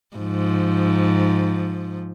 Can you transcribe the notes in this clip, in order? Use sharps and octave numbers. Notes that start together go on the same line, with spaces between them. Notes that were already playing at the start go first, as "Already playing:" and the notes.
G#2 F3